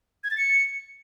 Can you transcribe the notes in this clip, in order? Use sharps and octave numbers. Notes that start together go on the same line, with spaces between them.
G#6
A6
C#7